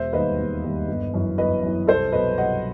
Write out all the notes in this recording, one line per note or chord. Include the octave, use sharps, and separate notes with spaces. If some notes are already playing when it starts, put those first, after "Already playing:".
Already playing: E1 C5 E5
D#2 D#3 G3 B4 D#5
E1
D#2 D#3 G3
G1
F#2 E3
G1 B4 D#5
F#2 E3
C2 A4 C5
B2 F#3 B4 D#5
C2 D#5 F#5